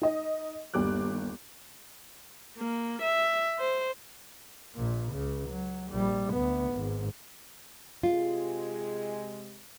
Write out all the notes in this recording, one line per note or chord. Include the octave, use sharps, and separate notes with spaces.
D#4 D#5
G1 D#2 G3 D6 F#6
A#3
E5
C5
A#1 A#2
C#2 C#3
F#3
A#1 G3
D2 B3
G#1 G#2
C3 G#3 F4